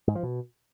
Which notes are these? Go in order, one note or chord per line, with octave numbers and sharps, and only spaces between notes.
G#2
F3
B2